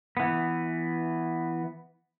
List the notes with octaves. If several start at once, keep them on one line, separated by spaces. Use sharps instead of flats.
E3 B3